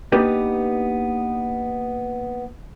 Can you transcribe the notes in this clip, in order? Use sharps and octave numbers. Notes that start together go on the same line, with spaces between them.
A#3 B3 D4 D#4 G4 B4